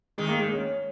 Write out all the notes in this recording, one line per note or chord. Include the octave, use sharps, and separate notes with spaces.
D#3 G#3
A#3
G#3
C#4